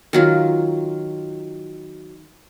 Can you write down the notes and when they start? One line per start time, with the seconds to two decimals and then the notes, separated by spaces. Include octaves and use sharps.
0.13 D#3 F#3 F4